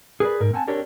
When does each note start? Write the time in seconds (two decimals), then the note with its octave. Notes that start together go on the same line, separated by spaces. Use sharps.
0.20 G#4 A#4 B4 D5
0.40 G#2 A#4
0.53 C4 F#5 G#5 A5
0.68 C4 D4 G4 A#4 C#5 D5